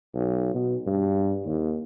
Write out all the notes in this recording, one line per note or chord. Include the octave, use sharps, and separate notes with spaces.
B1
B2
G2
D#2